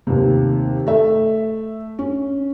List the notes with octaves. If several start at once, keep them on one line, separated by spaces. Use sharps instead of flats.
D#2 C3
A3 E5
C#4